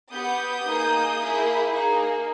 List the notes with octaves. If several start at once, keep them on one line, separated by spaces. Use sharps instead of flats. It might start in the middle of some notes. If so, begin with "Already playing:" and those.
B3 G4 D#6 G6
A#3 D#4 G#4
A#3 E4 G#4
A#3 D#4 G#4